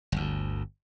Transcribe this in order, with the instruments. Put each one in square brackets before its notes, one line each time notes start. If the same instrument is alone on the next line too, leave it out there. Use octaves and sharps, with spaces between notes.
[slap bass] G1 D2